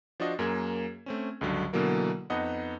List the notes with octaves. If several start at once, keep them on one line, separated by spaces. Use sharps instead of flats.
F3 D4 F4 F#4 D#5
F#2 A#3 G#4 G#6
A3 C4 C#4
C#2 G2 D3 F#3
B2 D3 E3 F#3 A#3 A#4
F2 B3 D#4 D#5 F#5